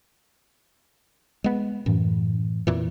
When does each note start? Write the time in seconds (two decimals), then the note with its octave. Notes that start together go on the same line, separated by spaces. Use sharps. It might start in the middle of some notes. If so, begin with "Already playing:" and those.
1.44 G#3 B3
1.86 F#2 A2 E3
2.67 F2 A#2 E3